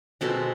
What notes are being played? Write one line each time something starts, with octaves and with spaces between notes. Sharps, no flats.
B2 G#3 C4 A4